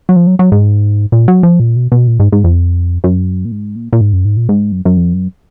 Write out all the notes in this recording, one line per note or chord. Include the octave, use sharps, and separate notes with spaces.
F#3
F3
F#3
F#3
G#2
A#2
F#3
F3
A#2
B2
B2
A#2
G#2
G#2
F2
F#2
A#2
G#2
A#2
A#2
G#2
F#2
G#2
A#2
G#2
F#2
F#2
F2
F#2